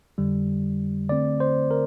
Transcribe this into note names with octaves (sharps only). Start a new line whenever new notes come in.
F2 D3 G3
D3 A3 C4 D5
C5
A#4